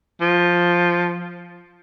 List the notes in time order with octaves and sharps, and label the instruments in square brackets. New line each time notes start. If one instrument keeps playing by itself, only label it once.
[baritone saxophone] F3